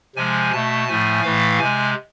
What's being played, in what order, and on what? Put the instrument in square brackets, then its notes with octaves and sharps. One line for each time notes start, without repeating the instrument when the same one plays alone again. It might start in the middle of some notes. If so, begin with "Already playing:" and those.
[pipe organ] C3 F3 G#3 G#5
B2 A3 A5
A2 F3 A3 G#5
A2 E3 A3 F5
C3 G#3 G#5